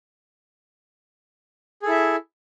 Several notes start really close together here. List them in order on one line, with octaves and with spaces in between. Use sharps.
G#4 A4 E4 E5